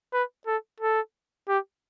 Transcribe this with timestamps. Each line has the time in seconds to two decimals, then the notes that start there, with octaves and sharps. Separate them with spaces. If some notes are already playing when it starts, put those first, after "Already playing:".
0.13 B4
0.47 A4
0.80 A4
1.48 G4